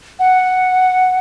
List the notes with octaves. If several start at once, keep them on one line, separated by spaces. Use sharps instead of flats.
F#5